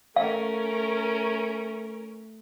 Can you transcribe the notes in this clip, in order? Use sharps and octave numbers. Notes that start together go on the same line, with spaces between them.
A3 C#4 A#4 F5